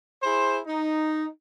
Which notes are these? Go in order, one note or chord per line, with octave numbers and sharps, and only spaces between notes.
E4 G#4 C5
D#4